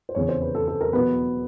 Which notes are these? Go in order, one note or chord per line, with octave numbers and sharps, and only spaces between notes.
C5
F1 E2 C#3 C#5
C5
B4
A4
A4
A#4
E2 B2 F#3 B3 B4